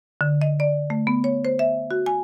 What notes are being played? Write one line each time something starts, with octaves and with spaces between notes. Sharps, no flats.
D3
D#5
D5
A3
B3
C#5
C5
E5
F#4
G#5